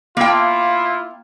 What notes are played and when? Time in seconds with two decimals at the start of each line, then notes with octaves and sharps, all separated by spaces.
0.17 A#3 E4 F4 G5